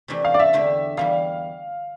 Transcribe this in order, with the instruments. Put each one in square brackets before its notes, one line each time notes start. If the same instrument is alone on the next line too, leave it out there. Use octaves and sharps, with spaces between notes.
[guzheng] C3 E3 A3 D4 G4
[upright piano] F5
D5
E5
[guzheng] E2 D3 A3 D4 G4
[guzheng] E2 E3 G3 [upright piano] F5